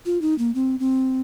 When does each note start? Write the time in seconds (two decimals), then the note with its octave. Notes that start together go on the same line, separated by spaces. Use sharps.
0.06 F4
0.22 D#4
0.38 A#3
0.55 C4
0.80 C4